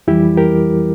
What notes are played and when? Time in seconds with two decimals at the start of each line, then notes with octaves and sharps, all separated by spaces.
0.07 F2 E3 G3 E4 G4
0.37 G4 A#4